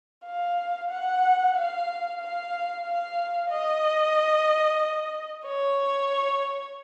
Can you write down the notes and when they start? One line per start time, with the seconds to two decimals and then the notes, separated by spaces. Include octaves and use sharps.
0.26 F5
0.91 F#5
1.56 F5
2.20 F5
2.85 F5
3.51 D#5
5.46 C#5